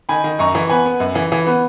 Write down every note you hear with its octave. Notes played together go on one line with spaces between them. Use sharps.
D#3 G#5 B5
D#3
F#2 A#5 C#6
E3
B3 G#5 B5
B3
F#2
E3
E3
B3